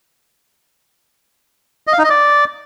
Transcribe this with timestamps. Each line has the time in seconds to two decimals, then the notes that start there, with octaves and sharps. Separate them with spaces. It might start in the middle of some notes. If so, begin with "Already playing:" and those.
1.87 D#5
1.93 F5
1.99 D#4
2.04 D#5
2.10 D5